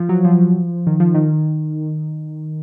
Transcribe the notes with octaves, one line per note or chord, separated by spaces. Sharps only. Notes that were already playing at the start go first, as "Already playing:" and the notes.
Already playing: F3
F#3
F3
D#3
F3
D#3